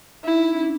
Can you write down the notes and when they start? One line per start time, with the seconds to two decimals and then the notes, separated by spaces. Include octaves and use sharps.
0.24 D#4 E4
0.52 C#4
0.63 D4